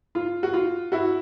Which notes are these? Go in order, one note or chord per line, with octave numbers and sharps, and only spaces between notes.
F4
F#4
F4
E4 F#4